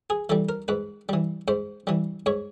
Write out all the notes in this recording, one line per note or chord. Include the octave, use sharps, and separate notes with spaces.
G#4
E3 G3 A4
A#4
G#2 B4
E3 G3
G#2 C5
E3 G3
G#2 C#5